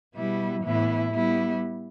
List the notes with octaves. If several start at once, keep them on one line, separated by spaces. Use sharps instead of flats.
B2 G3 B3 E4
A2 E3 B3 E4
G3 B3 E4